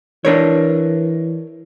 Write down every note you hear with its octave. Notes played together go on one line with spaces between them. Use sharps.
E3 D4 A#4 C#5